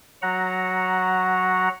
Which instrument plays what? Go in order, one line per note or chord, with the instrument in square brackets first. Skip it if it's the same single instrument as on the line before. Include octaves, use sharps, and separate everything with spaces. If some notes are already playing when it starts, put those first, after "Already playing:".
[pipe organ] F#3 F#4 F#5 A#5